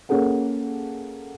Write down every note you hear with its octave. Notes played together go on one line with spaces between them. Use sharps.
A#3 C#4 G#4 A4 F#5